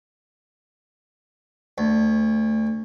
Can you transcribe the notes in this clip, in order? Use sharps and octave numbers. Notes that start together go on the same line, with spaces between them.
D2